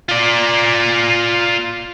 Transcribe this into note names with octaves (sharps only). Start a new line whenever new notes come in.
F4 D5